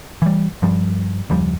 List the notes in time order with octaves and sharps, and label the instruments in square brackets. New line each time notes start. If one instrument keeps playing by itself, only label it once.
[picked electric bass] E3 G3
G2 F3 G3
F#1 D#2 F3 G3